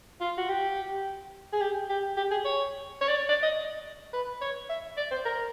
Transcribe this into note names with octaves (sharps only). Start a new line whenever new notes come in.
F4
F#4
G4
G#4
G4
G4
G4
G#4
C#5
C#5
D5
C#5
D5
D#5
B4
C#5
E5
D5
C5
A#4